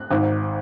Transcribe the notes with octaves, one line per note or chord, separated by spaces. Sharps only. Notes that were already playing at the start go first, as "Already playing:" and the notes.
Already playing: F#6
G#1 G#2